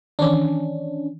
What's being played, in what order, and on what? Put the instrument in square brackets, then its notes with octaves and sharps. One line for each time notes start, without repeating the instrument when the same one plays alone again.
[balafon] D#3 E3 D6 [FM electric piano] C#4 D4